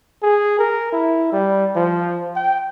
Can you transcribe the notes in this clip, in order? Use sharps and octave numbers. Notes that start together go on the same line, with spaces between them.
G#4
A#4
E4
G3
F3
G5